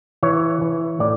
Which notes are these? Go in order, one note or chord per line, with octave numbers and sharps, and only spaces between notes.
E3 C#5
E3
A2 D5